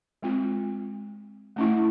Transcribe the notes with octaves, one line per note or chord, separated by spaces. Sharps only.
G#3 C4 F4
A3 C#4 E4